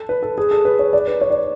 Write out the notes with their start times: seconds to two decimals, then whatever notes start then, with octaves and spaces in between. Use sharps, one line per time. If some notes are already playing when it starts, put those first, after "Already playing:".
Already playing: A4
0.09 B4
0.23 A4
0.38 G#4
0.51 A4
0.65 B4
0.79 C#5
0.93 D5
1.08 B4
1.21 C#5
1.30 D5